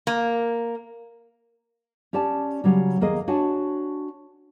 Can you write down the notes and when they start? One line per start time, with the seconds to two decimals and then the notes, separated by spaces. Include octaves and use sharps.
0.07 A#3
2.13 C#4 G4 D5 A5
2.64 C#3 F#3 G3
3.01 D#2 A#3 G#4 D#5
3.28 D4 F#4 C#5 G#5 A5